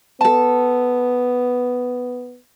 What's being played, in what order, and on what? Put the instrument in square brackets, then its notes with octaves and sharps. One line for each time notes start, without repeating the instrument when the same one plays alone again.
[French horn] B3 [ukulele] A4 A5